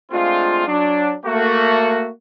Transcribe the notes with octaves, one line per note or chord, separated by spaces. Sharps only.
G#3 A3 C4 D4 F4
F#3 D4
A3 A#3 F#4